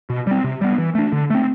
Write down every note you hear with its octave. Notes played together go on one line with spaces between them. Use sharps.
B2
G3 C4
C3
G3 B3
E3
A3 D4
D3
A3 C4